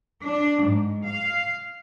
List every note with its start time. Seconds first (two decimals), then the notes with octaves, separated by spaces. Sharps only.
0.24 D4
0.65 G#2
1.05 F5